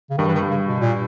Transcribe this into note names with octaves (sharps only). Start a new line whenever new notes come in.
C#3
G2 D#3
E3
D#3
G2
C#3
B2
A#2